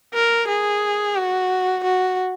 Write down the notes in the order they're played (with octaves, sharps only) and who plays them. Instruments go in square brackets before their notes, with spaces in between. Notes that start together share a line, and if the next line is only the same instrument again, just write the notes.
[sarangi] A#4
G#4
F#4
F#4